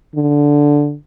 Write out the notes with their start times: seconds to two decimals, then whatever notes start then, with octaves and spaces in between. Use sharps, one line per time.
0.16 D3